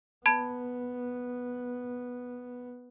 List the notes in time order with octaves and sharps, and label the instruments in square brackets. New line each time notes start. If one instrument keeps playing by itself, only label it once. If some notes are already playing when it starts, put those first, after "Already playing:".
[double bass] B3 [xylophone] A5 B5 G#6